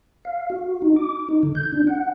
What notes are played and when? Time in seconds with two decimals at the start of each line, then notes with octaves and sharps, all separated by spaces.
0.25 F5
0.50 F#4
0.82 D#4
0.96 D6
1.29 D#4
1.43 D3
1.55 G6
1.72 D4
1.87 F#5